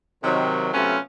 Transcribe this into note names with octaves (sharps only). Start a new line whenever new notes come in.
C3 D#3 F#3
C3 F#3 A3 B3 C#4 F4